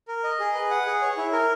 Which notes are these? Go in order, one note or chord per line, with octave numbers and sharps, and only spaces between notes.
A#4
D#5
G#4
B4
F#5
G#4
C#5
E4
A#4